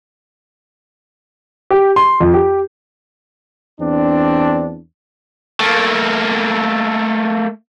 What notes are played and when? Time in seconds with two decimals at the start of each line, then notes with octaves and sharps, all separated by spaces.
1.71 G4
1.96 C6
2.20 F2
2.34 G4
3.80 E2 C4 D4
5.60 A3 A#3